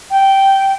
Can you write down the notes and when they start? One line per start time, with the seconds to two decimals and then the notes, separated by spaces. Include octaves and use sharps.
0.10 G5